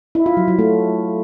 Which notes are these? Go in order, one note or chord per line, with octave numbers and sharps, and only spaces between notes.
E4
F4
F#3
F#3
A3